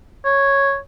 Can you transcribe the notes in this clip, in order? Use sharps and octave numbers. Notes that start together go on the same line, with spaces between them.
C#5